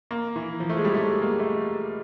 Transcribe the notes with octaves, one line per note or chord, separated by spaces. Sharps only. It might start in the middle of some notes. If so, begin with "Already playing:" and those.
A#3
E3
F3
A3
G#3
G3
A3
G#3
A#3
A3